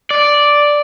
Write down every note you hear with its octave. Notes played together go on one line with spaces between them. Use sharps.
D5